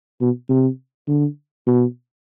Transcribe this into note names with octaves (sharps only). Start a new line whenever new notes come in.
B2
C3
D3
B2